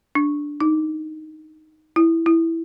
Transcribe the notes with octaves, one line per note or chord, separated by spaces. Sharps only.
D4
D#4
E4
E4